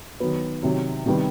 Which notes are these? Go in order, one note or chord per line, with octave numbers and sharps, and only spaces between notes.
D#3 F#3 B3
C3 D#3 F#3
C3 D#3 G3 B3